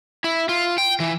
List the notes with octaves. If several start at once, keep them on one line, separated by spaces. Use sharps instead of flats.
E4
F4
G5
E3